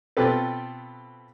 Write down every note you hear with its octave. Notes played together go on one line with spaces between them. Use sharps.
B2 C4 F4 G4 A4 B4